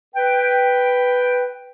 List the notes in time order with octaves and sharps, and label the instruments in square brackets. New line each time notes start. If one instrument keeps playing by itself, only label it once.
[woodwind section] B4 G5